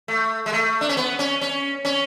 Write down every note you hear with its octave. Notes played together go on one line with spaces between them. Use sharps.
A3
G#3
A3
D4
C#4
B3
C#4
C#4
C#4